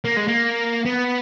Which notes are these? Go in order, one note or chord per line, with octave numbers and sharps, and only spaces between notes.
A#3
G#3
A#3
B3